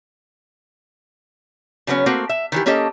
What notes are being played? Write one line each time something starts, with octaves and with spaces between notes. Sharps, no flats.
C#3 F#3 B3 C#4
A3 A#3 C4 F#4
E5
D#3 E3 G4
A#3 C#4 G4 A4 D#5